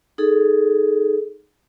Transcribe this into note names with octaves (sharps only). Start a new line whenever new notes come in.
D#4 G#4 A4